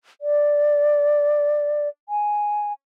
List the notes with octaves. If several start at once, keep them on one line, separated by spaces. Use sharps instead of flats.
D5
G#5